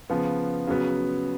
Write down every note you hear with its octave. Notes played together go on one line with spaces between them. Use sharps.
C#3 F3 B3
C#3 F#3 B3